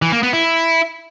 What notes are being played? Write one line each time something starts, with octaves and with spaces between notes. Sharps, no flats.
E3
A#3
B3
E4